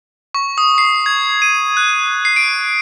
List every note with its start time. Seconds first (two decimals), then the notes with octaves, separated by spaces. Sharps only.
0.35 C#6
0.58 D#6
0.78 C7
1.06 G#6
1.42 D#7
1.77 F#6
2.25 C7
2.36 D7